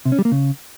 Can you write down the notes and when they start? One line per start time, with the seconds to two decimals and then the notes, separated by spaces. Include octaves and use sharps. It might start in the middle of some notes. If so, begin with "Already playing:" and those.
0.05 C3
0.12 C#4
0.19 G3
0.25 A#3
0.32 C#3